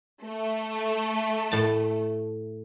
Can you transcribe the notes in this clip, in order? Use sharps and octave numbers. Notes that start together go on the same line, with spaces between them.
A3
A2 A5